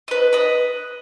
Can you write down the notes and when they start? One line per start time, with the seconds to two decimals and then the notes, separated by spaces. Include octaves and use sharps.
0.08 B4 D#5
0.33 B4 D#5